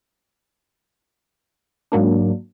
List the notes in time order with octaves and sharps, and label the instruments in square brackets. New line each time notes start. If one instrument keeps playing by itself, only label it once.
[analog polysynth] G#2 F#3 A#3 D4